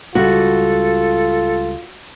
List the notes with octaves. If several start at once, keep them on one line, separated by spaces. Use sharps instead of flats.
C#2 G3 F4 F#4 A4